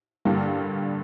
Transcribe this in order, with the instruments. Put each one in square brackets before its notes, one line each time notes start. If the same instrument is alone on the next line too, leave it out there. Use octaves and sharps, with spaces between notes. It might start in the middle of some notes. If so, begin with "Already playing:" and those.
[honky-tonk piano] G2 D3 G3 A#3